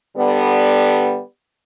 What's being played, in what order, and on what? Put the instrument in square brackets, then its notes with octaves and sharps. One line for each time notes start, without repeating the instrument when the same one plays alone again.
[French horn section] D3 G3 B3